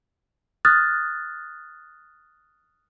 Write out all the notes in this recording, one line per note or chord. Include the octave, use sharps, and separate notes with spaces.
D#6 F6 F#6 A6